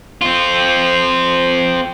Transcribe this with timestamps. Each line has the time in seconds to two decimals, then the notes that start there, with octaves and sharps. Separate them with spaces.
0.21 C4 F4